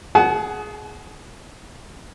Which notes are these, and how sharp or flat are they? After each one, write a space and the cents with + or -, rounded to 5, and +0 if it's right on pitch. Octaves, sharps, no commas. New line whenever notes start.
G#4 +10 F#5 +15 A5 -40